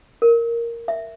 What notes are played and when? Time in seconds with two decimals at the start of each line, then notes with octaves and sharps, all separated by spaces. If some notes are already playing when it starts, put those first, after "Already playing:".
0.22 A#4
0.88 E5